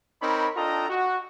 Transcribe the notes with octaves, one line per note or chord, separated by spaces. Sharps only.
C4 D#4 A#4 C#5 B5
D4 F4 A4 D#5 G5 A#5
F#4